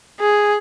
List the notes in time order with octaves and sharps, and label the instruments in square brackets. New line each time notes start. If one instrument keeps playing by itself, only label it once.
[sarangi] G#4